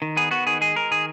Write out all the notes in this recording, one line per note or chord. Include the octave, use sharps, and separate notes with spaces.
D#3
B3 G#4
B3 F#4
D#3 G#4
G#3 G#4
G#3 A#4
D#3 G#4